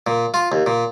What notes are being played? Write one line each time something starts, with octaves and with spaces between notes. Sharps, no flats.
A#2
F4
D#2
A#2